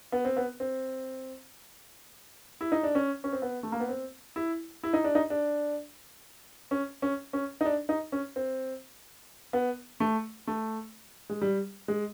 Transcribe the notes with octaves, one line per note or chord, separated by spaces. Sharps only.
B3
C4
B3
C4
E4
D#4
D4
C#4
C#4
C4
B3
A3
A#3
B3
C4
E4
E4
D#4
D4
D#4
D4
C#4
C#4
C#4
D#4
D4
D#4
C#4
C4
B3
A3
A3
G#3
G3
G#3